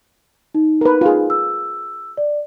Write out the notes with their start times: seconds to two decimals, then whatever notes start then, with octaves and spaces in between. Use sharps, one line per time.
0.55 D#4
0.81 A#4 B4
1.01 F4 G#4
1.30 E6
2.17 D5